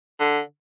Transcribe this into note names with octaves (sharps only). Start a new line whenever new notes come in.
D3